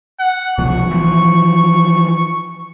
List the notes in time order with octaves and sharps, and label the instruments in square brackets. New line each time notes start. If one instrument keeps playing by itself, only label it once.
[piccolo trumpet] F#5
[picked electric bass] C2 B2 F3 [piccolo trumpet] C#6
[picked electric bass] E3 F3